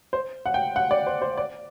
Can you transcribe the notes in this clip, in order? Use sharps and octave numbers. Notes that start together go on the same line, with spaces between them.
C5
F#5
G5
F#5
D5
C5
C5
D5